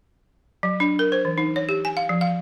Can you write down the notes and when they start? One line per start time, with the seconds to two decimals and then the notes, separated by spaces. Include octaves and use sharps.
0.63 F#3
0.80 D4
0.99 A#4
1.12 C5
1.25 E3
1.38 D#4
1.56 C#5
1.69 G4
1.85 G#5
1.97 F5
2.09 F3
2.21 F5